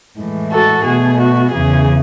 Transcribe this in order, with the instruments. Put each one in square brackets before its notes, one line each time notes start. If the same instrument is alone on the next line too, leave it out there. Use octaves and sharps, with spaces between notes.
[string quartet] A2 E3 G#3
F#4 A4
B2 A3 G#4
F#4
E2 C#3 E3 G#4